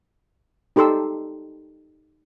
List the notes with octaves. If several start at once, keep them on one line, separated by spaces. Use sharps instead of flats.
D#4 G4 A4 C6 E6